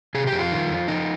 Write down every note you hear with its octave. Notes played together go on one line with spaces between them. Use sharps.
C3 G#4
G4
F2
F4
D#3
F2
F3 D#4